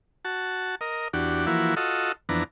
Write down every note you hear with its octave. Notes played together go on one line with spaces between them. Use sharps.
F#4 A5
A#4 D#5
E2 D4 F#4 G4
E3 F3 A#3 E4 F#4
F4 F#4 A4 D#5 E6
F2 E3 B3 D4 A#5